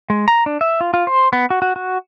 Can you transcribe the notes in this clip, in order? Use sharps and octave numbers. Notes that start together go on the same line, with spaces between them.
G#3
A#5
D4
E5
F4
F4
C5
B3
F#4
F#4
F#4